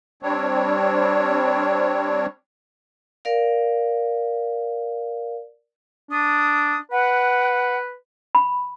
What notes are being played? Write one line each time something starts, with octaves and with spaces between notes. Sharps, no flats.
G3 C4 D4 C#5
A#4 D5 F5
D4 D#6
B4 F#5
B5